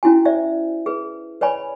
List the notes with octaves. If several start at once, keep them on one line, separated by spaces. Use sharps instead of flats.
C#4 E4 F#4 G#5
C5 D5 E5
G#4 B4
B4 C#5 D5 G#5 B5